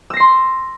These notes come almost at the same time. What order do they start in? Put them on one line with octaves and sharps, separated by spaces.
E6 A#6 C7 C6